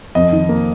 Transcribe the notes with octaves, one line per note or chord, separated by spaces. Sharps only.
F2 D#5
D#3
A#3